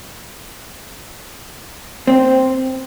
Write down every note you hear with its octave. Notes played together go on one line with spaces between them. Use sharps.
C4